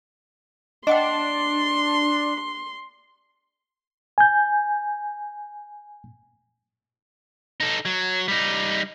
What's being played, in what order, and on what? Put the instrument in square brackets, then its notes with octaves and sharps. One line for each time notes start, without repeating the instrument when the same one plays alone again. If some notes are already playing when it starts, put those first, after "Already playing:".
[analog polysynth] D4 [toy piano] D#5 F#5 G5 [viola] C6
[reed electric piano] G#5 G6
[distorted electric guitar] D#4 A4
F#3
G3 D#4